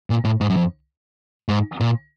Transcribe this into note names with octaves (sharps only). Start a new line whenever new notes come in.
A#2
A2
G#2
F#2
F2
G#2
A#2